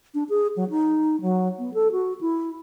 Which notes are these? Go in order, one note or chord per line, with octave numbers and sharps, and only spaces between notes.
D4
G#4
F#3
D#4
F#3
B3
A4
F#4
E4